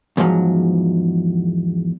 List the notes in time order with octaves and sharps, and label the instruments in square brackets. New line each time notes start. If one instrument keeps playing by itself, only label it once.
[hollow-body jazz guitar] E2 G#2 F3 F#3